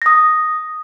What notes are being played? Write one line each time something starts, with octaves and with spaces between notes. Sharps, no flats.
D#6 A#6